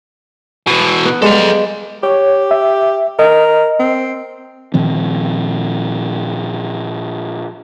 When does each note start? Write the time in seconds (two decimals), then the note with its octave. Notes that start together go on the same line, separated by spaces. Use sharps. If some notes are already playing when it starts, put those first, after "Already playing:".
0.67 B2 E3
1.05 B3
1.22 G3 G#3 A4 F5
2.03 G4 C#5
2.51 E5
3.19 A#4 D#5
3.80 C4
4.74 A#2 D#3 F3 C4